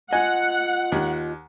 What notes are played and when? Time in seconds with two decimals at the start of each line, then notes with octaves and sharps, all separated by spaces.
0.13 F4 D#5 F#5 G#5
0.92 D#2